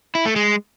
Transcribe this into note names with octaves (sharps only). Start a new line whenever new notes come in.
E4
A3
G#3